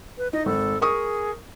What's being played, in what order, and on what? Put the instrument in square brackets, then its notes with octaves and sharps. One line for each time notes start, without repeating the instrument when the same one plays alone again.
[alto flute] B4
[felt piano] D#4 [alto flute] D#5
[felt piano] G#1 [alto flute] A4
[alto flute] G#4 [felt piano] A#4 C#6 D#6